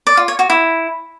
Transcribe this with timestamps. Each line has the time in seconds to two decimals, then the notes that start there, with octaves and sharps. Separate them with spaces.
0.07 D5
0.17 F4
0.28 C#5
0.39 F#4
0.50 E4